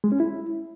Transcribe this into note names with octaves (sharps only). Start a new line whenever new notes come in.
G#3
C#4
E4